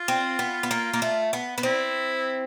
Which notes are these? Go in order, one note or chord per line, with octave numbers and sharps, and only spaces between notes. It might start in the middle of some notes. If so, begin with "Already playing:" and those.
Already playing: F4
C4
B3
B3
A#3
A#3
A3
B3
B3
C4 E4